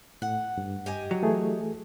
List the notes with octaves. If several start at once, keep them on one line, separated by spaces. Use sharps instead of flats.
A2 F#5
G2
G4 D#5 G#5
F#3
E3 A3 G#4